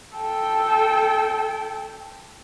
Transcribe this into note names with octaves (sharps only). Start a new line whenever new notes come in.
A4 G5